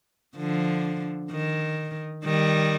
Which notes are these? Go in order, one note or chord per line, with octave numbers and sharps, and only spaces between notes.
D3 F3
D#3
D#3 G3